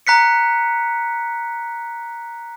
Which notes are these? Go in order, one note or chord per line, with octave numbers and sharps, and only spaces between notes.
A#5 F#6 B6 C#7